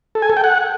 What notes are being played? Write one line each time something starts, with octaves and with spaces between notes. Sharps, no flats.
A4
G#5
A4
G5
F#5